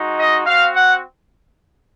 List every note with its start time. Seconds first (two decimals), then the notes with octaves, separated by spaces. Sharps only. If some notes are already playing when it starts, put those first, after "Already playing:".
Already playing: G#3 D#4 F#4
0.18 D#5
0.45 C4 F#4 F5
0.73 F#5